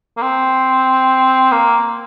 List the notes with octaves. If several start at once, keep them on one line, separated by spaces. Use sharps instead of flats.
A#3
C4
A#3